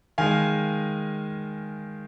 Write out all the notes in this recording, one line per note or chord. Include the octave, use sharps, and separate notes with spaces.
D#3 G#3 F5 G#5